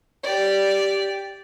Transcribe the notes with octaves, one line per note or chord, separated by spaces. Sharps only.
G4 D5